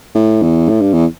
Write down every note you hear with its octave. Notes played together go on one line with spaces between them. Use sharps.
A2
E2
A2
G2
E2